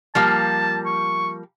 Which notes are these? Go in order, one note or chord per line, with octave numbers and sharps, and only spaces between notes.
F3 G3 A#3 A5
C#6